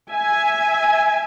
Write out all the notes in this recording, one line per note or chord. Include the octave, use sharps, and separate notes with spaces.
E5 G#5